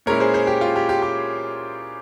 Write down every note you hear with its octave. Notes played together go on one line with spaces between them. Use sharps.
A#2 G#3 C#4 E4 A#4 C#5
G#4 C5
G#4 C5
G4
F4
G4
G4
G4